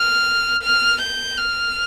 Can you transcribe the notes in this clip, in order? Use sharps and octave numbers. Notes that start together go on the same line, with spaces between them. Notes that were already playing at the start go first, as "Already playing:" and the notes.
Already playing: F6
F6
G6
F6